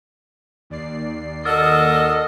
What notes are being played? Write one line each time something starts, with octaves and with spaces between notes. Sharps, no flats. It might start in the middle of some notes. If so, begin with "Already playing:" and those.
D#2 D5 C7
F#4 A4 A#4 D#5 E6 F6 A6